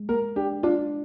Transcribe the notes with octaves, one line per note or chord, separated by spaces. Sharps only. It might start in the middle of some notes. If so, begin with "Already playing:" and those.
Already playing: G#3
A#3 A#4
D4 G4
D4 F4